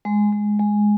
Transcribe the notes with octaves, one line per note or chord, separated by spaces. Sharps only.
G#3
G#3
G#3